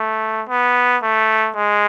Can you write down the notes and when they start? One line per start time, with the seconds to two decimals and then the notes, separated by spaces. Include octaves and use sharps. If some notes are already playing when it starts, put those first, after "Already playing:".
Already playing: A3
0.49 B3
1.03 A3
1.56 G#3